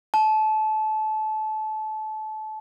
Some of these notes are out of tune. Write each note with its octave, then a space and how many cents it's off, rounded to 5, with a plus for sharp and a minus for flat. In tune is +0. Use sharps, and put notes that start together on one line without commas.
A5 -25